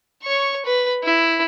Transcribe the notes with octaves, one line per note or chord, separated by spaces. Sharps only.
C#5 C#6
B4
E4